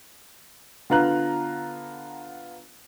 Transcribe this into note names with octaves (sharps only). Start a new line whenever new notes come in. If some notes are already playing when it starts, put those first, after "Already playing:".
D3 B3 F4 A#5 F#6